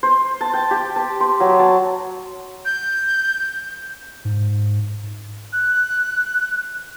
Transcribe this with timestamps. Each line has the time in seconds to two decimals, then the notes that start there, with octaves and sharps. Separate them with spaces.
0.03 C5
0.41 A5
0.54 G5
0.71 G4
0.96 A5
1.20 C6
1.40 F#3
1.59 A5
2.65 G6
4.25 G#2
5.53 F#6